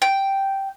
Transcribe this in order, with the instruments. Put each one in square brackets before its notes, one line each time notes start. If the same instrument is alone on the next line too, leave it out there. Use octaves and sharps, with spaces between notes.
[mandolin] G5